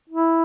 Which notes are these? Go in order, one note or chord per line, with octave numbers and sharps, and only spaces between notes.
E4